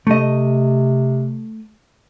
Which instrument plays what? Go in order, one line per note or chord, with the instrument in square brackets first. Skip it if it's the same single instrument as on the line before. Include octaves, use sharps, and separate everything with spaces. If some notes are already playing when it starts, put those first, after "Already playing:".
[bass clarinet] C3 [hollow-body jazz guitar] A3 D#5